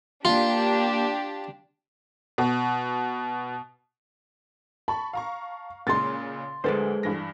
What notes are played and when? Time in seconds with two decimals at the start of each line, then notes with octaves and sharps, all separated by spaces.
0.25 A#3 D4 F4 G4
2.38 B2
4.88 A5 B5 C#6
5.13 F5 A#5 C#6
5.87 A#2 C#3 G#3 C6 A6
6.64 D2 G#3 A4 B4 C5
7.03 G2 E3 A#6